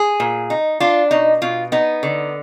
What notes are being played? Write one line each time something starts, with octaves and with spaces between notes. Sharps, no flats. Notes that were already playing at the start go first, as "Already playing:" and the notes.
Already playing: G#4
A#2
D#4
D4 F4
B2 D#4
B2 F4
B3 D#4
D3